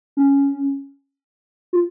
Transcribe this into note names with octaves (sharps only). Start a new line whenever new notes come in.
C#4
F4